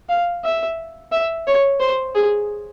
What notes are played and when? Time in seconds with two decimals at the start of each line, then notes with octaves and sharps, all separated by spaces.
0.09 F5
0.44 E5
1.12 E5
1.47 C#5
1.80 C5
2.15 G#4